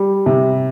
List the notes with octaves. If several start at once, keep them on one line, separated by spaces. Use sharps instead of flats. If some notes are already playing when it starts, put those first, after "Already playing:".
Already playing: G3
C3